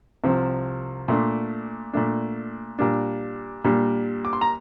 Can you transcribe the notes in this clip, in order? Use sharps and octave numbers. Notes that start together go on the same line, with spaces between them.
C2 C3 F3 C4
A#2 A3 D4 C6
A#2 A3 D4
A#2 G3 A#3 D4
A#2 G3 A#3 D4
D6
C6
A#5